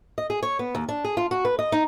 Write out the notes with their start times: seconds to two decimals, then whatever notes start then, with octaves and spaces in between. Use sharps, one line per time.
0.18 D#5
0.30 G#4
0.43 C#5
0.59 B3
0.75 D#2
0.89 D4
1.04 G#4
1.17 F4
1.31 F#4
1.45 B4
1.59 D#5
1.72 D#4